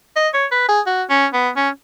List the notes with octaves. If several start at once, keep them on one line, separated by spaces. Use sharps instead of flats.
D#5
C#5
B4
G#4
F#4
C#4
B3
C#4